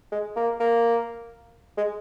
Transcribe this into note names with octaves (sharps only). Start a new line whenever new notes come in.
G#3
A#3
A#3
G#3